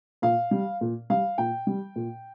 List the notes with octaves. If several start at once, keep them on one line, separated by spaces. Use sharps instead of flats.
A#2 F5
G3
A#2
G3 F5
A#2 G5
G3
A#2